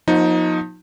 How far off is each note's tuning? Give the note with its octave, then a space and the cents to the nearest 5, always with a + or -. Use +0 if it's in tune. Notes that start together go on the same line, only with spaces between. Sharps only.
F3 +35 B3 -40 D#4 +10